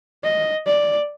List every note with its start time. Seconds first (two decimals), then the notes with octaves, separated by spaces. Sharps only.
0.23 D#5
0.66 D5